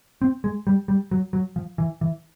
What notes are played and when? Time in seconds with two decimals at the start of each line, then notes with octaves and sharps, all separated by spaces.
0.22 C4
0.44 G#3
0.67 G3
0.88 G3
1.11 F#3
1.33 F#3
1.56 F3
1.78 E3
2.01 E3